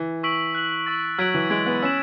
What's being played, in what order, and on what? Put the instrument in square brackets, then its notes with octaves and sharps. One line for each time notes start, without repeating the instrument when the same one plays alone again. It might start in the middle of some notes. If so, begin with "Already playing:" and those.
Already playing: [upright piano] E3
[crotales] C#6 E6 B6 D7 F#7
F#6 B6 F#7
C#6 E6 A6
[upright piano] F#3 [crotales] G#6 B6 D7 F#7
[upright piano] E3
[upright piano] G#3 [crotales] G#6 D7 F#7
[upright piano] B3
[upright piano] C#4 [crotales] E6 B6 E7